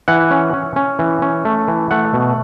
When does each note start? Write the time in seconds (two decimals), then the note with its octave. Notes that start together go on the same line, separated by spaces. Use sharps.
0.08 E3 F#5
0.31 C#4
0.54 C#4
0.76 C#4
0.99 E3
1.22 C#4
1.45 A3
1.68 E3
1.91 A3 F#5
2.14 B2